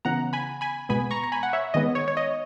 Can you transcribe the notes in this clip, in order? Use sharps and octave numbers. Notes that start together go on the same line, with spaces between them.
C#3 E3 B3 F#5 A#5
G#5 B5
G#5 B5
B2 G#3 B3 G#5 B5
A#5 C#6
A#5
G#5 B5
F#5
C#5 E5
D#3 G#3 B3 D#5
C#5
C#5
D#5